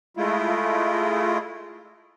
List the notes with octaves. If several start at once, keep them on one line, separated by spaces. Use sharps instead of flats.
G#3 A3 E4 F4